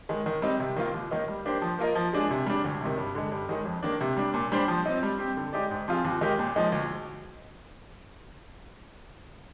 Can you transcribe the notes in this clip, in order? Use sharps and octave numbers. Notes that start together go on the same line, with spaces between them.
D#3 G#3
D#3
G3 C4 D#4
C3
D#3 A#3 F4
D#2
D#3 A#3 D#4 A#4
G3
A#3 D4 G4 C5
F3
A#3 F4 A#4 D#5
F3
G#3 D4 G#4
C3
G3 D4
D2
C3 D#3
G2
D3 G#3
G2
D#3 G#3 D#4
F2
D#3 A#3 D4
C3
G3 D4
A#2
G3 D4 G4 C5
F3
C4 D#4
G3
C4 G4
D3
G#3 D#4 G4 D5
G#2
F3 C4 F4 G#4
D#2
D#3 G#3 D#4 G4
A#2
F3 G#3 D#4
D2